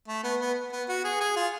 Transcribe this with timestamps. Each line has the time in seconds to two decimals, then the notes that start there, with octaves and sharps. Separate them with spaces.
0.08 A3
0.24 B3
0.41 B3
0.72 B3
0.89 F#4
1.04 G#4
1.21 G#4
1.37 F4